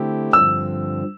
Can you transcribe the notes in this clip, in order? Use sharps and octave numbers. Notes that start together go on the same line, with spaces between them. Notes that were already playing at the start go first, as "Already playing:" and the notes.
Already playing: D3 A3 C4 E4 G4
G2 D3 F3 C4 E6